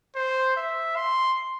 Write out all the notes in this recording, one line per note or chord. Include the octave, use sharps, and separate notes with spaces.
C5
E5
C6